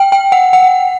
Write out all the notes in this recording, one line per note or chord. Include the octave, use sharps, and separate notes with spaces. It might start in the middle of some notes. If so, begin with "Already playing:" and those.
Already playing: G5
G5
F#5
F#5